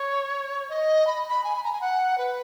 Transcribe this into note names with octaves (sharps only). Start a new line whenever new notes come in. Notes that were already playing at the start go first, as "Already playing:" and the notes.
Already playing: C#5
D#5
B5
B5
G#5
B5
A#5
G#5
F#5
B4